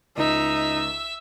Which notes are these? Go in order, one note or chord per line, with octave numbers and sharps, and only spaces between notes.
C#2 D#4 E5 E6